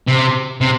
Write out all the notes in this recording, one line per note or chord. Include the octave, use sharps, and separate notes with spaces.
C3
C3